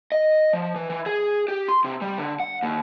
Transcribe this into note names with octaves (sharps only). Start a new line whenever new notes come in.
D#5
F3
E3
E3
G#4
G4
C6
C3
G3
D3
F#5
D#2